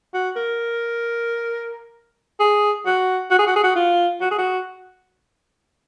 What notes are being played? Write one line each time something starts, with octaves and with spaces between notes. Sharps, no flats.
F#4
A#4
G#4
F#4
F#4
G#4
F#4
G#4
F#4
F4
F#4
G#4
F#4